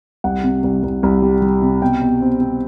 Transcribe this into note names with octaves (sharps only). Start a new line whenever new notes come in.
C2 F#5
C3
C2
C2
C2
G3
G3
C3
B2 G5
B2
C4
C4